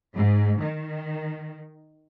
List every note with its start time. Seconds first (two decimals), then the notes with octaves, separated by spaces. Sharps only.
0.15 G#2
0.61 D#3